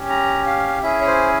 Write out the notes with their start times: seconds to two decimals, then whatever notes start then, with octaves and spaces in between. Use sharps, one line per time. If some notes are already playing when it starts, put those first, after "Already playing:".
Already playing: C#4 G4
0.09 A#5
0.46 F5
0.83 C#4 E4 G#4 E5
1.01 C#5
1.07 C5